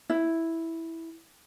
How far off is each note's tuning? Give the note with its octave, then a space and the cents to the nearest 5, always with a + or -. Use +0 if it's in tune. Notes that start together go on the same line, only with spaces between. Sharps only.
E4 -5